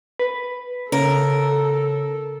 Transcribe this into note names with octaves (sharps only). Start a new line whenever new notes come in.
B4
C#3 A4 A#4